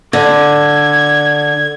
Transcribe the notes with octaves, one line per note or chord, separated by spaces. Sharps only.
D3 G#6